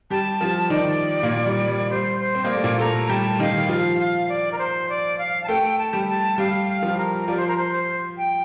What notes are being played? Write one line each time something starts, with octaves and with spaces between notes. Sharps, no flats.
G3 G4 A5
F3 F4 A5
D#3 D#4 D5
A#2 A#3
G3
G3
G3 C5
C5
C4
A#3 D#5
A3 D5
A#2 A#3
A3 A4 A#5
G3 G4 A5
D#3 D#4 F5
F3 F4 F5
F5
D5
A#4
C5
D5
F5
A5
A3 A4 G5
A5
G3 G4
A5
G3 G4 F5
F5
F3 F4
A#4
F3 F4 D5
C5
A#4
C5
C5
G5